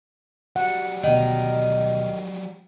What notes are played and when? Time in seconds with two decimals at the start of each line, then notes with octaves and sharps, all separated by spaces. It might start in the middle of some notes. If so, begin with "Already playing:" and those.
0.56 F#3 G3 F#5
1.03 D2 B2 D#3